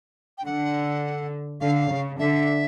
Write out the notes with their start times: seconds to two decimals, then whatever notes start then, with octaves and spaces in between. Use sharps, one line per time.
0.38 G5
0.45 D3 F#5
1.61 D3 F5
1.91 C#3
2.19 D3 E5